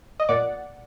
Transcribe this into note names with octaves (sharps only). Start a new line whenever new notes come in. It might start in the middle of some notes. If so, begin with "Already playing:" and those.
D#5
A#2 D5 F#5